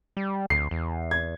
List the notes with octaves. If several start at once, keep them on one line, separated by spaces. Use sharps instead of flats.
G3
D2 C7
E2
G#6